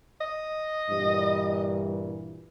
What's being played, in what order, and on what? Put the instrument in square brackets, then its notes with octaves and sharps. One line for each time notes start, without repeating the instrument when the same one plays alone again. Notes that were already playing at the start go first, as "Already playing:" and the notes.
[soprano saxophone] D#5
[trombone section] G2 A#2 E3